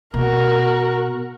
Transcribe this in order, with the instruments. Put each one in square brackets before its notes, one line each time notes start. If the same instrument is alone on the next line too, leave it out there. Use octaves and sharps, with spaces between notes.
[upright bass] B2 [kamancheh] F#4 A#4